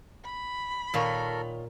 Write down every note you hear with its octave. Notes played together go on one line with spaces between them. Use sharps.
B5
A#2 D#3 F4 A4 A#4 C#5